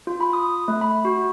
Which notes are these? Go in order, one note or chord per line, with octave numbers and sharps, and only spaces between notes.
F4
B5
D#6
A3
B5
F#4